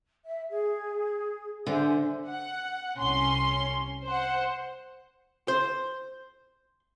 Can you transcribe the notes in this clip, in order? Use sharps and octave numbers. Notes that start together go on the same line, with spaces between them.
E5
G#4
D3 C5 E5 G#5
F#5
C2 C#4 C6
C5 F#5
C5